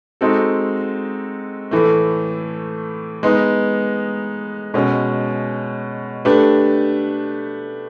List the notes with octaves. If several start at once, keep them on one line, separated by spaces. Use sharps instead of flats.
G#3 C4 D#4 F#4 A4
A2 E3 A3
G#3 B3 D#4
B2 G#3 C#4
A3 D4 G4 B4